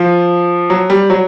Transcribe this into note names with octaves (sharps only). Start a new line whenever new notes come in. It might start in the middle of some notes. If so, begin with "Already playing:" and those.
Already playing: F3
F#3
G3
F#3